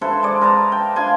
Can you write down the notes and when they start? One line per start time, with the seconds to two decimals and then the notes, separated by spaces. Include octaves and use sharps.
0.01 E4 A4 B4 C5
0.23 G#3 D5
0.41 A#4 B4 A5 A#5
0.72 G5
0.96 D4 F4 G#5 C6